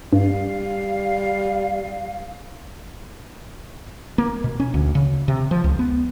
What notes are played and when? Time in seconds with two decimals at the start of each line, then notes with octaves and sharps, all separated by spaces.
0.13 G2 G3 F5
4.18 A#3
4.44 B2
4.60 C#4
4.74 D2
4.95 C#3
5.28 C3
5.51 F3
5.64 C#2
5.79 B3